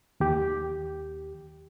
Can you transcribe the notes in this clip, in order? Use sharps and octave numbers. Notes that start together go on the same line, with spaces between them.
D#2 G4